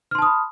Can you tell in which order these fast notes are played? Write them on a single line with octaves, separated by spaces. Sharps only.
F6 C6 A5 D#6 B5